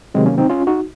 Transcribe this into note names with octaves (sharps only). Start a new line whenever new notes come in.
C3 D#3 F#3 G#3 C4
A#3 C#4
C4 D#4
C#4 F4
D#4 F#4